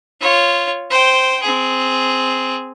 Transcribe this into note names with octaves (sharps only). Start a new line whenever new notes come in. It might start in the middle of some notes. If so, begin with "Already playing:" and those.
F4 C#5
C5 G5
C4 G#4